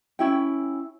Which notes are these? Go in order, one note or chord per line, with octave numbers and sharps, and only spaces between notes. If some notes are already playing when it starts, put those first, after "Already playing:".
C#4 E4 G5